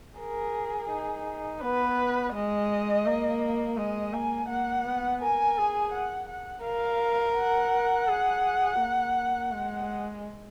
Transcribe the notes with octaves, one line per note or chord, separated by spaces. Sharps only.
G#4 A#4
D#4
B3 B4
G#3 D#5
A#3
G#3 D#5
A#3 G#5
A#3 F#5
B3
A#4 G#5
G#4
F#5
F#5
A#4 F5
F#5
G#4
A#3
G#3